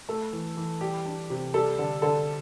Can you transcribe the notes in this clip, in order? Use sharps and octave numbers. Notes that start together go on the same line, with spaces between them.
A3 A4
E3
E3
G3 G4
D4
C3
G3 A4
D3
D3 A4